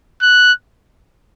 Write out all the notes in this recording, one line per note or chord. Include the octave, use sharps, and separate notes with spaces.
F#6